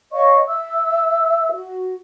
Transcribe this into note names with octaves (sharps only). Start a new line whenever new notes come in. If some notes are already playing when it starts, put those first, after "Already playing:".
C#5 D#5 F5 C#6
E5 E6
F#4